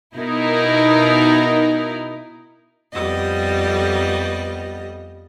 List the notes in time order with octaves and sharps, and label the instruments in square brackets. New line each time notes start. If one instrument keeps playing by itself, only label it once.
[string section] B2 D#4 E4 A#4
[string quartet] F2 G3 B3 D#5